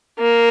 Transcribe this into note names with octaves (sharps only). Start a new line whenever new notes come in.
A#3